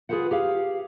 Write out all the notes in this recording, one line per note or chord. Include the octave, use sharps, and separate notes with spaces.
F4 G#4 A4 B4 C5 F#5
G4 G#4 F5